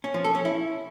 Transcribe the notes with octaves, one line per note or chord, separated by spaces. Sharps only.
C#4
F3
A4
C#4
E4